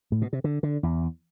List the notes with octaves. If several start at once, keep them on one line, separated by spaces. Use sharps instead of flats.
A2
B2
C3
D3
D3
E2